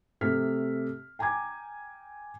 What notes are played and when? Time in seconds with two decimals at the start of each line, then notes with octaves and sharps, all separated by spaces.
0.21 C3 A3 F6 B6
1.19 G5 G#5 A#5 D6 G#6